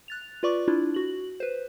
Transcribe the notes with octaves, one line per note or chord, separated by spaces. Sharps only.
F#6 A6 F7
F4 B4 D5 C#6 D6
D4 E4 F4
F#4 F#7
B4 C5